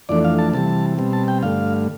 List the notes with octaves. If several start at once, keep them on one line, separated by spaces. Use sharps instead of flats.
F2 E3 A3 D4 D5
F5
A5
C3 E3 G3 A5
B2 G3 C4
A5
G5
G2 D3 A3 F5